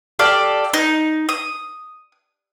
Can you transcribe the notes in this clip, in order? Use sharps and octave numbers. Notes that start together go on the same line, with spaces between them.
G4 A4 D5 F5
D#4
D#6